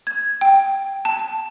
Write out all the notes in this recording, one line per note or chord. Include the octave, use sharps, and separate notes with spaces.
G#6
G5
A5